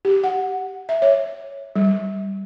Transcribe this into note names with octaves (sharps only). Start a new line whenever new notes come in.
G4
F#5
E5
C#5
G3